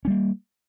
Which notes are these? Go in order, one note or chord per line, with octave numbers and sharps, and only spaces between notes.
G3 A#3 C#4